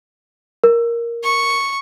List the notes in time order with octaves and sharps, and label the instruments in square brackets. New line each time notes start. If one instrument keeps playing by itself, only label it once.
[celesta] A#4
[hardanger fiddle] C#6